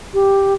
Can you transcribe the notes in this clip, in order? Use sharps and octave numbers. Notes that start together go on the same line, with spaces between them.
G4